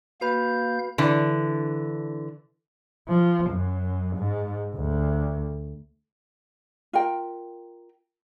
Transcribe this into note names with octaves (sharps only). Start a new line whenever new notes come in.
A#3 F#4 B4 F5 B5 G6
D3 E3
F3
F#2
G#2
D2
F4 A#4 G5